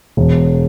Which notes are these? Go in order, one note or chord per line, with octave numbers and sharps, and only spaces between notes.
E1